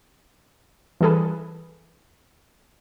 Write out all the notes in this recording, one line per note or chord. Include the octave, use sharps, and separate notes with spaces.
E3 G3 G#4 A4 B4